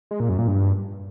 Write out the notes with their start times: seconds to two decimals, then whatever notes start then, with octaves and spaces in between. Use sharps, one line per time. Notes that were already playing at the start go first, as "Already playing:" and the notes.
0.11 G#3
0.20 A#2
0.29 F#2
0.38 A#2
0.48 G2